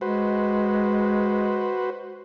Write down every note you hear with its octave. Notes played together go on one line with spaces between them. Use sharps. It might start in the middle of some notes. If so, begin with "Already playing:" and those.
G#3 F#4 B4 C5